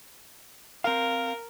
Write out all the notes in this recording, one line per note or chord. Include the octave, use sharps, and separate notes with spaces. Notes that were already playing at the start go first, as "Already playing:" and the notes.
C4 A#4 F5